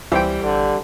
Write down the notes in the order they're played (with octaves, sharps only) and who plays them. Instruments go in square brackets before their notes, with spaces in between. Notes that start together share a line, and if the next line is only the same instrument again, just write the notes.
[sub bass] C#2 [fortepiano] E3 C4 G5 [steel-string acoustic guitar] G3
[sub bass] A1 [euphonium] D3